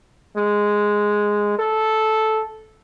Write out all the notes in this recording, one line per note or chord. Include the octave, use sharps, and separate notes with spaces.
G#3
A4